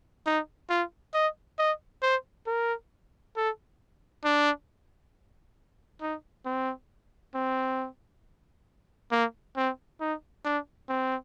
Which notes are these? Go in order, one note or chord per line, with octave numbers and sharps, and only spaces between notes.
D#4
F4
D#5
D#5
C5
A#4
A4
D4
D#4
C4
C4
A#3
C4
D#4
D4
C4